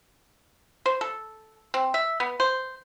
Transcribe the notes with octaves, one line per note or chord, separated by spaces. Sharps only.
C5
A4
C4
E5
B3
C5